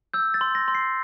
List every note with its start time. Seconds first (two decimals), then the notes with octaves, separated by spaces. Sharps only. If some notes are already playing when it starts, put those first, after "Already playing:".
0.14 E6 G6
0.34 A6
0.41 C6
0.55 A#6
0.68 C6
0.75 C7